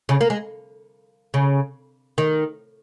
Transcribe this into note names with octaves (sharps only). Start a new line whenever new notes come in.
C#3
A#3
G#3
C#3
D#3